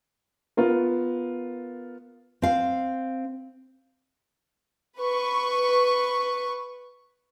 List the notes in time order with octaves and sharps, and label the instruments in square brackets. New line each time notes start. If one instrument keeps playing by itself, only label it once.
[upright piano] B3 F4 A#4
[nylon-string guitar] C4 F5
[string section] B4 C#6